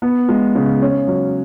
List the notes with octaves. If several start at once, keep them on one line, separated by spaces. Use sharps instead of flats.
B3
G#3
C#3
C#4
F#3